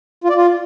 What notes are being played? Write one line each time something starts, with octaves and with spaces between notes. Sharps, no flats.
F4
D5
F4